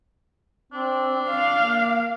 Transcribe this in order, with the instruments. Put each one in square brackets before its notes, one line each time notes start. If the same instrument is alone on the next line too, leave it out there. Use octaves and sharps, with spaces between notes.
[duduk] C4 [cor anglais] D4
[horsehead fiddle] F5
[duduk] A#3